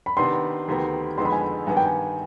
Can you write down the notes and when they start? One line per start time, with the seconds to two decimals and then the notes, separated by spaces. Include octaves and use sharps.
0.06 B5
0.17 C3 D#3 B3 D4 C6
0.68 D2 C3 D#3 B3
1.17 F2 D3 G#3 B3 D#4 C6
1.25 B5
1.32 G#5
1.41 B5
1.67 G2 D#3 B3 G#5
1.77 G5
1.86 G#5